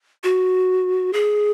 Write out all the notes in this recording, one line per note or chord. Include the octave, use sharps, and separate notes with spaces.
F#4
G#4